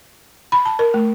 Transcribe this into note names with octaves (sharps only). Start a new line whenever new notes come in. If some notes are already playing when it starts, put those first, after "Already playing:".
B5
A5
A#4
A3